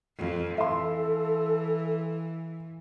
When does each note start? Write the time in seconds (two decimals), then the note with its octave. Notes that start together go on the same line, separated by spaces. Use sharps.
0.18 F2
0.58 E3 A4 E5 F5 C6